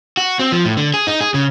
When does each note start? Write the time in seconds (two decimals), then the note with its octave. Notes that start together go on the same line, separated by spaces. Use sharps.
0.17 F#4
0.39 C4
0.52 F3
0.65 A2
0.77 D3
0.94 G#4
1.07 D#4
1.21 G#4
1.34 C#3